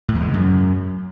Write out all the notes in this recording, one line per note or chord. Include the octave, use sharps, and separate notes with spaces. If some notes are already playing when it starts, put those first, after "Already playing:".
A2
E2
G#3
C#3
F#2